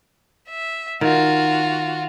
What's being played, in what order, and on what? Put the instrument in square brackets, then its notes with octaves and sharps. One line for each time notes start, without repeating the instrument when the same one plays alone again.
[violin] E5
[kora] D#3 [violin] F4 F#4